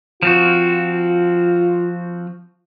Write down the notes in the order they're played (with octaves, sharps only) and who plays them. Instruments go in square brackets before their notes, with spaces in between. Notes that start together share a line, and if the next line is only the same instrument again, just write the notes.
[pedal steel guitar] F3 C4 F#4 [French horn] F4